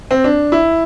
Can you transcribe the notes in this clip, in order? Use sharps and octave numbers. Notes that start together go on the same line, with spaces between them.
C4
D4
E4